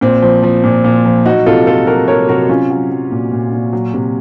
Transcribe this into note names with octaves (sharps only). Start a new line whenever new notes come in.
A#2 C4
F3
F3
A#2
A#2
F3
F#3 D#4 F#4
C3 F4 A4
F#3 F4 A4
F#3 F#4 A#4
F#3 A#4 C#5
C3 F#4 A#4
F#3 C#4 F4
F#3
F#3
A#2
A#2
A#2
F#3
C3